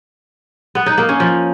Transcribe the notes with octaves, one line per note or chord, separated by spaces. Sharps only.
B3
D#4
A#3
C#4
F3